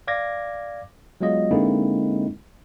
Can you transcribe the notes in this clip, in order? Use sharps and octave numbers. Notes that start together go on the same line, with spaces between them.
D5 F5 D6 G#6 A#6
F#3 G#3 B3 F4 D#5
D3 G#3 A#3 C4 D#4 E4